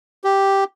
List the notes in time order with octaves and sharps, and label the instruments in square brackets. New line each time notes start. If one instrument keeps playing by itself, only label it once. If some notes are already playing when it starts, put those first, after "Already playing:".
[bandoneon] G4